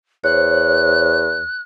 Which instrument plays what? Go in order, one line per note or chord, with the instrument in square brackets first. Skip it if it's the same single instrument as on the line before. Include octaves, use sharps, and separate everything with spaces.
[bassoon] E2 [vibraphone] C5 C#5 [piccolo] F#6